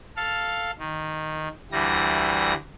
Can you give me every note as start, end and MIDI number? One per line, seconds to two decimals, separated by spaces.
0.17 0.71 69
0.17 0.71 77
0.79 1.48 51
1.72 2.53 38
1.72 2.53 52
1.72 2.53 55
1.72 2.53 94